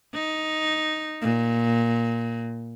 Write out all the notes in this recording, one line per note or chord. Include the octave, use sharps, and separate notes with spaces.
D#4
A#2